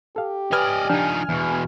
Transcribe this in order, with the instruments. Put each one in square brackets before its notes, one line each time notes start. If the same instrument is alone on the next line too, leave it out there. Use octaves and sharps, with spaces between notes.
[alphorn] G4 [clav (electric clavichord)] A4 F5
[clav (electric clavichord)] B4 [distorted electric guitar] D5 D#5 [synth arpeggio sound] G#5 F6
[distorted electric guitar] F3 D#4 [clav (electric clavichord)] D4
[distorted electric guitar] E2 B2